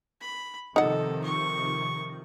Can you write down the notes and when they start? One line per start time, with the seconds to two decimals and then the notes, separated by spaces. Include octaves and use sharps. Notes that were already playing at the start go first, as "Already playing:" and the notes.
0.21 B5
0.76 C3 D#3 F3 D#4 A4 F#5
1.24 C#6